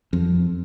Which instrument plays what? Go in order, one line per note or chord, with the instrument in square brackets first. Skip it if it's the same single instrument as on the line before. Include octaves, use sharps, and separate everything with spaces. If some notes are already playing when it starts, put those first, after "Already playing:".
[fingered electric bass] F2